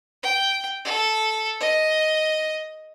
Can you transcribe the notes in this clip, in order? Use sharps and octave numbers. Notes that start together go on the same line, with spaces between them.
G5
A4
D#5